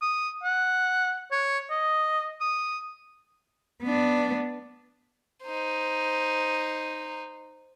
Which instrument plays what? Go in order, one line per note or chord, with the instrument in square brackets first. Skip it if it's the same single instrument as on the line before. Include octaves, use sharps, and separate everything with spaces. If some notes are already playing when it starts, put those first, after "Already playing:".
[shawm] D#6
F#5
C#5
D#5
D#6
[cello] B3 D4
[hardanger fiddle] D#4 C5